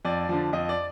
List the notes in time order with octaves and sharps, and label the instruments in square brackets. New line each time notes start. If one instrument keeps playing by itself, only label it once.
[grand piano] F2 D5
D3 F3
F2 D#5
D5